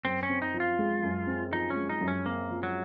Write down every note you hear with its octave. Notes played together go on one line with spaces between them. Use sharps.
F#2 C4
C#4
C4
D#4
F3
F4
G#3
F#2
C4
F3 D#4
C#4
G#3
D#4
F#2
C#4
A#3 C4
F3
F#3